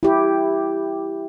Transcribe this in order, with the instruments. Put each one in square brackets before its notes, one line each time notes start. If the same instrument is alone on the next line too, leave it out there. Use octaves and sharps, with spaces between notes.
[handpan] E4 G4